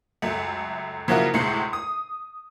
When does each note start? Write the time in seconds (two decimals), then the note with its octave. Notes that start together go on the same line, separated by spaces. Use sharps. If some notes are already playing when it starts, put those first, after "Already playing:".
0.22 C#2 F#2 A3
1.08 C#3 F3 F#3 A#3 E4 F#4
1.34 D2 A2 C3 G#3 C7 C#7
1.73 D#6